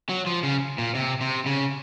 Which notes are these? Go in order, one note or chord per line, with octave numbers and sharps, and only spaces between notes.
F#3
F3
C#3
A#2
C3
C3
C#3